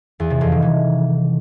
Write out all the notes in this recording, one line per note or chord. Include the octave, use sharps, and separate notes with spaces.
E2
C3
F2
D#3
E3